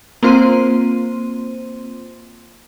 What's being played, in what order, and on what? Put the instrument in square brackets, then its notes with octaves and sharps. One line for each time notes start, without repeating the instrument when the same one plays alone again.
[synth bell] A#3 C4 F4 C5 C6 D#7